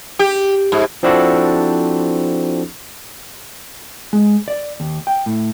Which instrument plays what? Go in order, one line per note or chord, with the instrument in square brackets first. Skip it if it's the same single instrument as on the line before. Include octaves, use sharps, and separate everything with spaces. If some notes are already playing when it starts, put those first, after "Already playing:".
[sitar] G4
G#2
[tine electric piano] F3 C4 D4 E4 F#4 A4
[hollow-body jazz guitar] G#3
D5
D#2
G5
A2